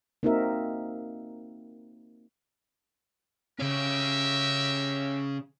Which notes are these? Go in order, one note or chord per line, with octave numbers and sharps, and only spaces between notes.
A#3 C4 D#4 F#4 A#4 E5
C#3 C#4 G4 A#4 E5